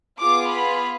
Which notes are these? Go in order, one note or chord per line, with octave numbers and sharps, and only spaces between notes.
B3 F4 G#4 D6
B5